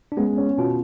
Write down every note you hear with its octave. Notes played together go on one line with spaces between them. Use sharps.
D4
G#3 B3 C#4
C#4
B2 F4